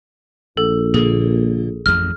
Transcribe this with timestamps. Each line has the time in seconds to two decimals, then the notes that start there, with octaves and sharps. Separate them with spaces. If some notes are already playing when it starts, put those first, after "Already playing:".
0.57 A#1 A4
0.94 A#2 D3 A#3 G#4
1.86 A1 F2 F6